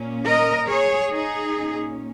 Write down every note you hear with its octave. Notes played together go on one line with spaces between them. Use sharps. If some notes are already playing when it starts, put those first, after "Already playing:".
Already playing: A#2 A#3 C#4
A#4 D#5
G#4 C#5
D#4 G#4
A#2 A#3 C#4